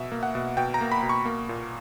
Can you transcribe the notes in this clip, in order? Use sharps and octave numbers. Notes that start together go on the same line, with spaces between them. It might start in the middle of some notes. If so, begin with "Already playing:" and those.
Already playing: B2 E5
A#3
F#5
B2
B2 G5
A#5
A#3
B5
B2
C#6
A#3
A#2